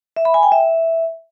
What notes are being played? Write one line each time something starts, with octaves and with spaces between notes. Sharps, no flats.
E5
B5
G#5
G5
E5